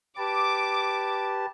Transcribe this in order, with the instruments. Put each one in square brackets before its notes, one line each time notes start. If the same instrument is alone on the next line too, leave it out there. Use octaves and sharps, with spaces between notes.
[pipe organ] G4 B4 A5 [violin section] D6